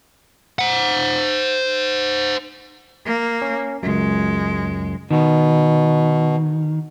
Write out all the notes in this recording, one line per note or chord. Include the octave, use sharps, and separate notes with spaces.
C5 F#5
A#3
C#4
C#2 F#2 G#3
B2 D#3